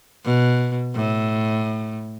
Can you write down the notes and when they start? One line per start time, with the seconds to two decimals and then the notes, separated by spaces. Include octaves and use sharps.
0.25 B2
0.95 A2